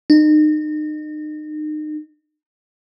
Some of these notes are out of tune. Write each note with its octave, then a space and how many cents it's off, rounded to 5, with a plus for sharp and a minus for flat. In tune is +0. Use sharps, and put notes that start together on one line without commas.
D#4 -35